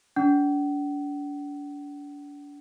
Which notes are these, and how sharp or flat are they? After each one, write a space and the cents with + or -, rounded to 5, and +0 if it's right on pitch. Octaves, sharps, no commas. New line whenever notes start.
D4 -35 F#5 +45